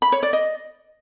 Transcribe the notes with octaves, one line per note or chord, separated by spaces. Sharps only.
B5
C#5
D5
D#5